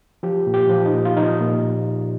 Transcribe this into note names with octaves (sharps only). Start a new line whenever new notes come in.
F3 G4
A#2
G4
F3
D#4
A#2
F4
F3 D#4
A#2